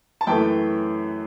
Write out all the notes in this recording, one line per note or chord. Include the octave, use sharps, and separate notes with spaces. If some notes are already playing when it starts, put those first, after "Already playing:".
A5
F#2 E3 A3 G5